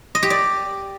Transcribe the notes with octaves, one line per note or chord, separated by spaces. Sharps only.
D#5
G4
D5